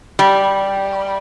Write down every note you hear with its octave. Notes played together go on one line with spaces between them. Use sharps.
G3